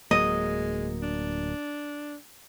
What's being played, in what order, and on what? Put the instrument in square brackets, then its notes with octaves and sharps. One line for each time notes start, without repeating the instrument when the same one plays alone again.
[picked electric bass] D1 F#3 A#3 [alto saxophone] G#3 [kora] D#5
[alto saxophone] D4